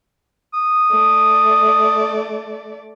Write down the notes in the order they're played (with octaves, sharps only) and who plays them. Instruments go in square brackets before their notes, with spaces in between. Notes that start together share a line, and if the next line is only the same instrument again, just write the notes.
[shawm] D#6
[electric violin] A3 D5